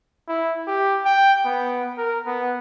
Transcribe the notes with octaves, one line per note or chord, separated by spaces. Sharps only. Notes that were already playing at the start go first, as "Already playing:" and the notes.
E4
G4
G5
B3
A#4
B3